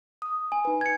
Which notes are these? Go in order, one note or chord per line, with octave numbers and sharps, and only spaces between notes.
D#6
G#5
D#4 B4
G#6 C#7